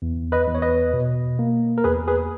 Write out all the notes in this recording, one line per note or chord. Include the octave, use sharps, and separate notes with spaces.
E2
B4 D#5
E2
C#5
B4 D#5
B2
A#3
A#4
E2 G#4 B4
G#4 B4